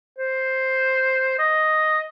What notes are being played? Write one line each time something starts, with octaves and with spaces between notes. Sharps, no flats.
C5
D#5